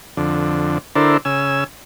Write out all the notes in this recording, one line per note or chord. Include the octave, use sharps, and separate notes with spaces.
F2 D3
D3 D4 E4 A4 A#4 C5
C#3 G#5 E6